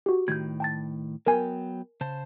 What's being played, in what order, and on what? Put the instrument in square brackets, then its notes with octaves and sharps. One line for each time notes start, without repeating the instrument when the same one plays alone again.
[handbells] F#4 G4
[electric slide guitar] A2 D#3 [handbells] G6 G#6
[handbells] G5 A5 A6
[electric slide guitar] F#3 B3 G5 [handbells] A#4 G#5
[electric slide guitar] C#3 C5 A5